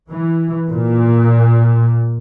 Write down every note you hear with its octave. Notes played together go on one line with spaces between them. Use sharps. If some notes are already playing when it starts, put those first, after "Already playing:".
E3
A#2